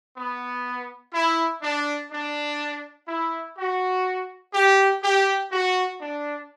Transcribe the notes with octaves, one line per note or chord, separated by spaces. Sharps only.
B3
E4
D4
D4
E4
F#4
G4
G4
F#4
D4